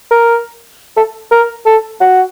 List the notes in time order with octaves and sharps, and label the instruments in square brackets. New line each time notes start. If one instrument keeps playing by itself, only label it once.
[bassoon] A#4
A4
A#4
A4
F#4